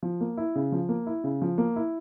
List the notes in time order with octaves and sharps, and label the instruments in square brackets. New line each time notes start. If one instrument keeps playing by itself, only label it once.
[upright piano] F3
A#3
E4
C#3
F3
A#3
E4
C#3
F3
A#3
E4